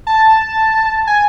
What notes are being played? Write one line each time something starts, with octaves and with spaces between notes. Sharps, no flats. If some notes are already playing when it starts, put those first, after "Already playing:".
A5
G#5